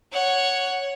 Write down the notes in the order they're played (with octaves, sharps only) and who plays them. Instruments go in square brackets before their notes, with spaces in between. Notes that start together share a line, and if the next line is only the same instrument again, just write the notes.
[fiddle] C#5 F#5